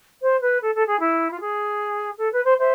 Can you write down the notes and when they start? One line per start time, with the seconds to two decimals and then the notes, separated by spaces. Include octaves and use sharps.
0.22 C5
0.41 B4
0.61 A4
0.74 A4
0.87 G#4
1.00 E4
1.30 F4
1.40 G#4
2.18 A4
2.32 B4
2.45 C5
2.58 C5 E5